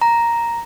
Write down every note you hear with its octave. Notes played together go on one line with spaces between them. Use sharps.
A#5